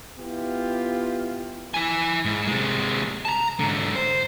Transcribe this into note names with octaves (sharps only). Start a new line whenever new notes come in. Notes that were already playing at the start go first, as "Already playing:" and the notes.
B3 E4 F4 G4
E4 G#5
G#2
C3 G#3
A5 A#5
G#2 D3
C5